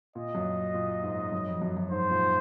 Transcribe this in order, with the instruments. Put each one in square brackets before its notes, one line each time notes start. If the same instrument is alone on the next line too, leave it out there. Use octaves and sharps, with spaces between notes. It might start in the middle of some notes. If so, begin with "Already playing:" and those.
[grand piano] A#2 [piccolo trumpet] D#5
[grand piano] F#2
A#2
G#2
F#2
F2
F#2
F#2
[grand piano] G#2 [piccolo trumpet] C5
[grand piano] A#2